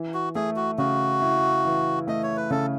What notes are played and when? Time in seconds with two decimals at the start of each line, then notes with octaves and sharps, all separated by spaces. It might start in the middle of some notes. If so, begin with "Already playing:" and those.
Already playing: E3
0.14 F#4
0.35 A3 G#4
0.56 F#4
0.78 C#3 F#4
1.22 E4
1.65 E3
2.07 A3 D#5
2.23 C#5
2.37 B4
2.50 C#3 A4